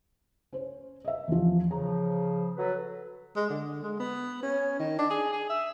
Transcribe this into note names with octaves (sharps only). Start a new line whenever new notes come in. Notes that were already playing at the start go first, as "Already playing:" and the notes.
C#4 C5
D#5 E5
E2 F3
C#3 F3 A#5
F#3 A4 B4
G#3
D3
G#3
B3
C#4
D#3
D4
G#4
G#4
E5